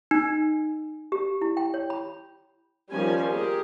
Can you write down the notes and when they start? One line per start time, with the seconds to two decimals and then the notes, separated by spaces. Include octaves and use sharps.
0.11 D#4
1.12 G4
1.42 E4
1.57 G5
1.74 C#5
1.90 B5
2.91 D#3 F3 G3 C#4 G#5
3.31 G4 G#4 A#4